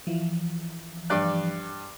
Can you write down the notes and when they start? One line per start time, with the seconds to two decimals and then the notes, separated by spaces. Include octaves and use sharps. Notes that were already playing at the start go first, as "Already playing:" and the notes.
0.07 E3 F3
1.10 G2 D5 F#6